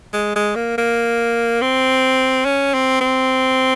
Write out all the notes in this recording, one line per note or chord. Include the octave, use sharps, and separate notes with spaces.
G#3
G#3
A#3
A#3
C4
C#4
C4
C4